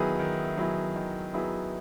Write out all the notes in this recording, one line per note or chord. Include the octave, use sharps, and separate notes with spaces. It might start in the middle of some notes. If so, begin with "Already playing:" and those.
Already playing: D#3 F#3 B3 E4 G#4
D#3
F#3 B3 E4 G#4
D#3
F#3 B3 E4 G#4